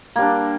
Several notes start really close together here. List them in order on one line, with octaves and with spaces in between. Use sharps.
A#3 G3 D4